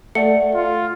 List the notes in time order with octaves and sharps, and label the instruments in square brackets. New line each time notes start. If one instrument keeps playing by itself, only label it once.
[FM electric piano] A3 [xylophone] D5 F#5 C#7
[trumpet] F4